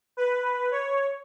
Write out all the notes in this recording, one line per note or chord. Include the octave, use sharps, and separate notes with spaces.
B4
C#5